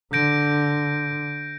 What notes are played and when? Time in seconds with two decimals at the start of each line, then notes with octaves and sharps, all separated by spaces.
0.13 D3 G6 A#6 D7